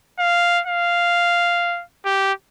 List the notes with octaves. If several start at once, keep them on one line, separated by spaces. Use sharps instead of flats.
F5
F5
G4